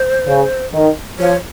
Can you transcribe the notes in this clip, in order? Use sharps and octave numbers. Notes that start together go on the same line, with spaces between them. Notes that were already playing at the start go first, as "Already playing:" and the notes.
Already playing: C5
C#3
D#3
F3 C#5